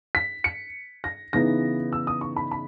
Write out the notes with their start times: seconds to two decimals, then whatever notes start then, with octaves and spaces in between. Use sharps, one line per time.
0.15 B6
0.44 C#7
1.04 A#6
1.33 C#3 E3 B3 D#4 A#6
1.93 E6
2.07 D#6
2.21 C#6
2.36 B5
2.51 B5